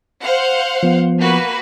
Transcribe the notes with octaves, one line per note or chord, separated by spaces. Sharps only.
C5 F5 F#5
F3 B3
A#3 F#4 B4